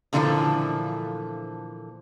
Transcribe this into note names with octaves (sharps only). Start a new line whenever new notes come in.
A#2 D3 E3 F3 G3 A3